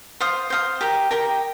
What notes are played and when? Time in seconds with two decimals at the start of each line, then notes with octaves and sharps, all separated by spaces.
0.20 C5 F5 D#6
0.50 C5 F5 D#6
0.81 G4 A#4 G5 A#5
1.11 G4 A#4 G5 A#5